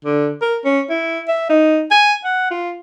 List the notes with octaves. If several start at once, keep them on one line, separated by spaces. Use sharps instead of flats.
D3
A#4
C#4
E4
E5
D#4
G#5
F#5
F4